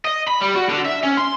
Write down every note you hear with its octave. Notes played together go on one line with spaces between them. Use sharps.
D#5
B5
G3
F#4
D3
E5
C#4
C6